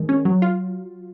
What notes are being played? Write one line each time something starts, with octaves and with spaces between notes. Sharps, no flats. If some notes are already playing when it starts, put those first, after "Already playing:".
Already playing: D#3 G#3
C#4
F#3
F4